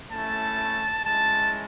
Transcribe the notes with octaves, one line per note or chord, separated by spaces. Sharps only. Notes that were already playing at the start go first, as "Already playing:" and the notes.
A3 C#4 E4 A5
G#3 C#4 E4 A5